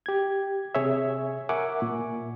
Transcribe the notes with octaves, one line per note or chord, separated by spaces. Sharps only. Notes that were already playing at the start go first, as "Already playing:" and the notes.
G4 G#6
C3 G#4 C#5 E5
A#4 E5 F#5 G#5 C#6 D6
A#2